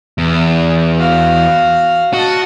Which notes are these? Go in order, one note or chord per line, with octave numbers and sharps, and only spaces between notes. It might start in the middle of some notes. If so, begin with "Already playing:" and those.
E2
F#4 F5
F#4 D#5 A5